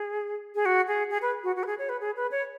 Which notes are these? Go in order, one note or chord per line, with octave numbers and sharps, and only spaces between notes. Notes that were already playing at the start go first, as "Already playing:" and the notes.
Already playing: G#4
G#4
F#4
G#4
G#4
B4
F#4
F#4
B4
G#4
C#5
B4
G#4
B4
C#5